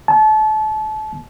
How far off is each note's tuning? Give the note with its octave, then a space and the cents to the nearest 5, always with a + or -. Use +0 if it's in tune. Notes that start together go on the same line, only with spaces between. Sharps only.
A5 -30